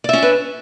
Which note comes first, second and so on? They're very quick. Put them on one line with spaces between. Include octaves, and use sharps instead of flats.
D5 E5 C#4 D4 B4